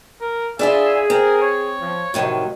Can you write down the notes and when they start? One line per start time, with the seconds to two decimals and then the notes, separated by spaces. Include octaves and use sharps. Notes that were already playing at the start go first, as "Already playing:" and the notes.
0.21 A#4
0.59 D4 E4 F4 G#4 E5
1.10 C4 A#4
1.42 C#5
1.80 F3
2.14 A2 C3 D#3 F3 F#3